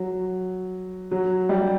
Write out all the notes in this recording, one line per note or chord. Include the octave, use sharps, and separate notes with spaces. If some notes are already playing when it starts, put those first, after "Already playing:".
Already playing: F#3
F#3
G3